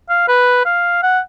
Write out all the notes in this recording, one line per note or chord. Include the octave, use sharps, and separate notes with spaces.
F5
B4
F5
F#5